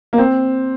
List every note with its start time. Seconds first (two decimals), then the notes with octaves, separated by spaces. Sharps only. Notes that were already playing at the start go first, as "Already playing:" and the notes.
0.13 A#3
0.18 C4